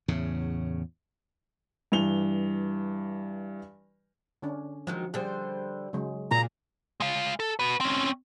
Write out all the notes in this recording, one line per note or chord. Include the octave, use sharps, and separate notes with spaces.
E2 A2 C#3
G2 E3 F7 G7
D3 C#4 D4
D#3 F3 F#3 G#3
D3 G3 G#4 C5
C#3 F#3 G#3
A#2 G#4 A#5
G#3 F5
A4
F#4 B4
C4 C#4